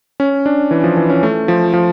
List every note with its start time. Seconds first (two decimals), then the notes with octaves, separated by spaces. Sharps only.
0.20 C#4
0.46 D4
0.71 E3
0.84 F3
0.97 E3
1.10 C#4
1.23 A3
1.48 F3
1.74 F3